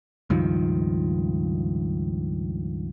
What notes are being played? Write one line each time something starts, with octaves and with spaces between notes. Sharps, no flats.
C#2 G2 D#3 F3